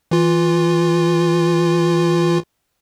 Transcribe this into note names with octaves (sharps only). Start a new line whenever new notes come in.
E3 F4